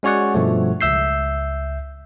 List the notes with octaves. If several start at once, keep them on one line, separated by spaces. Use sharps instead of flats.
G#3 C#4 F#4 C#5 D5 F#5
G2 B2 F3 A3
C#2 E5 E6 G6 C7